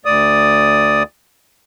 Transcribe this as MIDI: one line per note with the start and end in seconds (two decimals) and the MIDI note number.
0.05 1.03 38
0.05 1.03 74
0.05 1.03 87